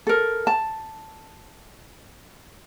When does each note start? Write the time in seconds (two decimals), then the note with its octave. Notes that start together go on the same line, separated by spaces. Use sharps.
0.07 A4 A#4
0.47 A5